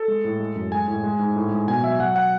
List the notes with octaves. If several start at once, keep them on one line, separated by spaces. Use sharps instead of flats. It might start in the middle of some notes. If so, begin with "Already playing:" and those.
Already playing: A4
G#3
A2
G#3
F#2
G#3 G#5
A2
G#3
G#2
A2
G#3
B2 G#5
F#3 E5
F#3 F#5
F#5